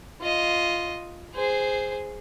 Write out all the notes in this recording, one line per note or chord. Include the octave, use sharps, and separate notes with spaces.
F4 D#5
G#4 C5